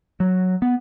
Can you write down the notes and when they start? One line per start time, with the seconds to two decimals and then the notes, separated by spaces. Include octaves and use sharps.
0.20 F#3
0.62 B3